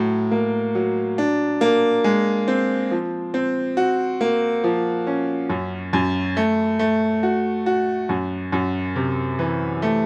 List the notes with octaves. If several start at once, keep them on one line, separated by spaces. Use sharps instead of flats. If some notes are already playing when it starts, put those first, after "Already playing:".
Already playing: A2 F#3
A#3
F#3
D4
A#3
G#3
C4
F3
C4
F#4
A#3
F3
C#4
F#2
F#2
A3
A3
F#4
F#4
F#2
F#2
C3
E3
A3